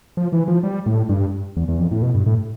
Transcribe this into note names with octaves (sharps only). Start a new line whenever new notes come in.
F3
E3
F3
G3
A2
G2
E2
E2
F2
A2
B2
G2
A2